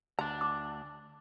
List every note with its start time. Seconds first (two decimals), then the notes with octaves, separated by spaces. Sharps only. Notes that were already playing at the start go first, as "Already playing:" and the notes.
0.19 D2 D4 A#5
0.41 D6